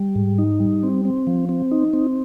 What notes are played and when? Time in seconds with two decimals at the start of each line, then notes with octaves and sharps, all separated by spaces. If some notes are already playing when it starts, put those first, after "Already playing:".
Already playing: G3
0.15 G#2
0.38 D#4
0.60 G3
0.83 C4
1.05 C4
1.27 F3
1.49 C4
1.71 D#4
1.93 C4